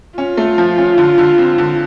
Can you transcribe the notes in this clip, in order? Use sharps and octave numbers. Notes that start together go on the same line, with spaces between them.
C#4 F4
A3
F3
C#4
D3
D3
C4
D3